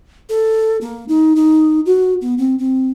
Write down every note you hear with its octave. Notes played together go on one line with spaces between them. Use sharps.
A4
A#3
D#4
D#4
F#4
B3
C4
C4